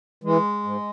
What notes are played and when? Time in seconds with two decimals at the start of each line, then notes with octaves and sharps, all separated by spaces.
0.24 E3 G#3
0.63 G#2